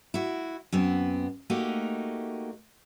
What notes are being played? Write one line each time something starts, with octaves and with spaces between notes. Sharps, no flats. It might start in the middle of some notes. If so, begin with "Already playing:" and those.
E4 F#4
F#2 B3 C4
A3 A#3 D#4 F#4 G4